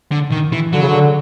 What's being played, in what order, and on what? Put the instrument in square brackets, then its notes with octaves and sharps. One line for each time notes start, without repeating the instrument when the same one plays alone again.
[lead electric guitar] D3
D#3
E3
[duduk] D3 [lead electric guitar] F#3
[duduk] C#3
D3